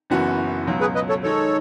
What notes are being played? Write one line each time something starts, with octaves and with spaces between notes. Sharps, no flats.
F#1 F#2 E3 B3 F#4
C#2 B2 F#3
G#4 B4
B4 D#5
A4 C#5
D#3 G#3 D#4 A4 C#5